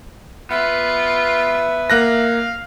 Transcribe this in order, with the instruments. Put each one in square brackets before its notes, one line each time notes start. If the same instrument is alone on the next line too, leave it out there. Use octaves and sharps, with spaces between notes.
[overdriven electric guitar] B3 [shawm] F4 [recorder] E5
[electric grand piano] A#3 F#6 A#6 [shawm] F5